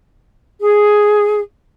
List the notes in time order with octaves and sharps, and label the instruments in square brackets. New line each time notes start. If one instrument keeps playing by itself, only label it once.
[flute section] G#4